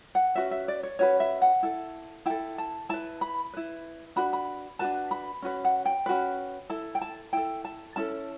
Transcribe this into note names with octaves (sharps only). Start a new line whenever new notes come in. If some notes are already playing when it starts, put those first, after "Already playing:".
F#5
C#4 F#4 B4 E5
E5
D5
C#5
C#4 F#4 B4 C#5
E5
F#5
E4 A4
E4 A4 G5
A5
E4 B4 A5
B5
E4 B4
D4 F#4 B4 B5
B5
D4 F#4 B4 A5
B5
C#4 F#4 B4
F#5
G5
C#4 F#4 B4
E4 A4 A5
G5
A5
E4 A4 G5
A5
C#4 E4 A4 A5